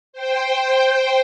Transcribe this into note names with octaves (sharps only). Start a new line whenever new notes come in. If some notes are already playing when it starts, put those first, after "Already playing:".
C5 G5